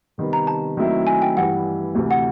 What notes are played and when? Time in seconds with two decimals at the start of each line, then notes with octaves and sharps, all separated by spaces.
0.18 C3 D#3 G3 B3
0.33 A#5
0.47 A5
0.77 D#3 F#3 A3 C4 E4
1.07 G#5
1.22 G5
1.36 G2 E3 G3 F#5
1.95 D2 C3 E3
2.11 F#5